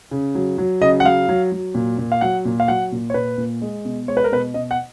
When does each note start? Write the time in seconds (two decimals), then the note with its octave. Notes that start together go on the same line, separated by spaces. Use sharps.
0.11 C#3
0.35 F#3
0.58 F#3
0.81 C#3 D#5
1.00 F#5
1.04 F#3 F5
1.29 F#3
1.52 F#3
1.75 A#2
1.98 A#2
2.12 F5
2.21 F#3 F#5
2.45 A#2
2.60 F5
2.68 F#3 F#5
2.92 A#2
3.10 C#5
3.14 A#2 B4
3.38 A#2
3.62 G#3
3.85 B2
4.08 G#3 C#5
4.17 B4
4.24 A#4
4.32 B2 B4
4.54 B2 D#5
4.71 F#5